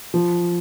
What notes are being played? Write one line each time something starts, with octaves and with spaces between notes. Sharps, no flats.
F3